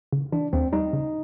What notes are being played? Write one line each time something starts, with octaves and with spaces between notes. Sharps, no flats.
C#3
E3 D4
D#2 C4
G3 D#4
C#3